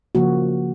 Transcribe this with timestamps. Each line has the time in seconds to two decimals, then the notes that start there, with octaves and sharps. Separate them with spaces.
0.15 C#3 F3 A#3 F#4